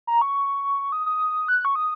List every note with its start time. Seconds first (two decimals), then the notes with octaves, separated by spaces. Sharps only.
0.07 A#5
0.22 C#6
0.92 D#6
1.06 D#6
1.48 F#6
1.65 C#6
1.75 D#6